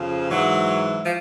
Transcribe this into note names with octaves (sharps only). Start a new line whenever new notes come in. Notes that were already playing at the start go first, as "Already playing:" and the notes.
Already playing: F2 C#3 F3
G#2 E3 F#3
F3